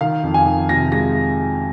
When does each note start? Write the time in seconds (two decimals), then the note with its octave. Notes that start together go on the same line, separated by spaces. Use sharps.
0.01 D#3 F5
0.24 F2
0.34 G#5
0.46 D#3
0.69 C3 A#6
0.92 G#3 A#6